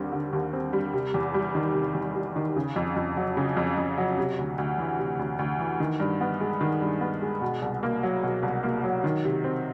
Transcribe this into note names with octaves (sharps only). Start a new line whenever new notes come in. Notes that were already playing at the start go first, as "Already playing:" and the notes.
Already playing: D#2 D3 G3 C4
D3
D#2
C4
G3
C3
E2
G3
D#3
C3
E2
G3
D#3
C#3
F2
F2
F#3
C#3
F2
F2
F#3
C3
D2
D2
E3
C3
D2
D2
E3
D#3
G2
B3
G#3
D#3
G2
B3
G#3
B2
C2
A#3
F#3
B2
C2
A#3
F#3
D#3
C3
C4